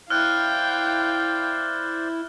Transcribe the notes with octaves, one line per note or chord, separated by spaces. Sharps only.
E4 C5 D5 F5 G5 F6 F#6